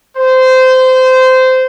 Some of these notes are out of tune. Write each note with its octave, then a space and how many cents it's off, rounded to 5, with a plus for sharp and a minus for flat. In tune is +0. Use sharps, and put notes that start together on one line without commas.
C5 -20